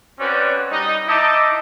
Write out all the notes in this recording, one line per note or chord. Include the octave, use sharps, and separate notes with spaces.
C4 C#4 F#4 B4 C5 D5
G3 D#4 D#5
D#4 E4 D#5 A5 D6